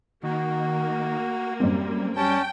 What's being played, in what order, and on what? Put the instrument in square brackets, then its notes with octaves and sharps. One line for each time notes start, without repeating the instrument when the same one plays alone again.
[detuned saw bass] D#3 [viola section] A#3 [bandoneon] F#4
[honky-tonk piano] F#2 C4 [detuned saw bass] G3
[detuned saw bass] G3 [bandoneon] C#4 A5 [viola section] G5